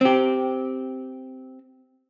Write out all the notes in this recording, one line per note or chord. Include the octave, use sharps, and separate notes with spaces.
C4 G4